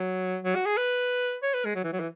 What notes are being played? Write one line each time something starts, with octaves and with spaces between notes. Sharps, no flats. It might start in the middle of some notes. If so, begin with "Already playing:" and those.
Already playing: F#3
F#3
F#4
G#4
B4
C#5
B4
G#3
F#3
E3
F#3
E3